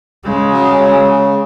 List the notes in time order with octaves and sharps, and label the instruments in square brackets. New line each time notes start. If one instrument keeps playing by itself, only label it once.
[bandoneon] C#3 [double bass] G#3
[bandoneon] F#3
C#3